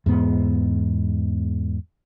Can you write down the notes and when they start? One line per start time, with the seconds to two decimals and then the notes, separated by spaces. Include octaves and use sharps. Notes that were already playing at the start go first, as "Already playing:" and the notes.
0.06 E2 G#2 B3